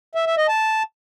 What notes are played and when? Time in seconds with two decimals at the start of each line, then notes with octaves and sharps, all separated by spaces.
0.15 E5
0.26 E5
0.37 D#5
0.48 A5